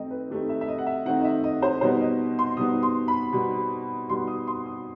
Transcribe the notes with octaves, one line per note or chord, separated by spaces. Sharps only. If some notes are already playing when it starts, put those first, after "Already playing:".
Already playing: D#3 A3 C4 D#4 D#5 G5
B4
D#3 A3 C4 D#4 G4
E5
E5
D#5
F#5
E5
D#3 A3 C4 D#4 F#5
D#5
E5
D#5
C5
B2 G3 B3 D#4 C5
D#5
C6
B2 G3 B3 D#4 D#6
C6
B5
B2 G3 B3 D#4
B2 G3 B3 D#4 C6
D#6
C6
D#6